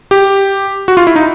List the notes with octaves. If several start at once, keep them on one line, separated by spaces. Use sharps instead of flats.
G4
F#4
F4
E4
D#4